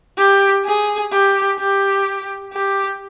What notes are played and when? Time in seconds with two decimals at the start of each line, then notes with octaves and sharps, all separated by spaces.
0.18 G4
0.65 G#4
1.12 G4
1.59 G4
2.53 G4